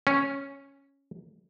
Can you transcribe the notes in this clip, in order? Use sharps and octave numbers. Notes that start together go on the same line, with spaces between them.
C#4